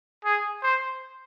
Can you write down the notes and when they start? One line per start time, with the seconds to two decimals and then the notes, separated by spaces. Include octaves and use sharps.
0.25 G#4
0.63 C5